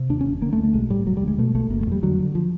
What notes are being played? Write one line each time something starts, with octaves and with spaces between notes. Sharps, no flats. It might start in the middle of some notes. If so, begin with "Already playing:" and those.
Already playing: C3
D#2 D4
C#4
F1
D3 A#3
A3
D2
A3
B1 G#3
A2 G3
E1 F#3
G3
D2
G#3
B2 A3
B1 A3
F#1 A#3
A3
F2
G3
D3 F#3
D3
F3